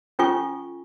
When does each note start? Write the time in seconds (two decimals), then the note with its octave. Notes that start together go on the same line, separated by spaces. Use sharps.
0.19 C#4 F4 A4 G#5 C#6